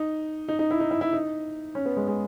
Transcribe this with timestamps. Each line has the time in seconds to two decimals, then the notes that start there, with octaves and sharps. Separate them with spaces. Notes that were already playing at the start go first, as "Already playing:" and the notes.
Already playing: D#4
0.48 D#4
0.59 D#4
0.71 E4
0.80 D#4
0.91 E4
1.01 E4
1.13 D#4
1.75 C#4
1.86 B3
1.97 G#3
2.08 G#3